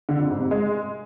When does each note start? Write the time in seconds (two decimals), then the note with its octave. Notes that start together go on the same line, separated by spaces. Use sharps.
0.09 D3
0.19 F2
0.30 G#2
0.40 C3
0.51 G#3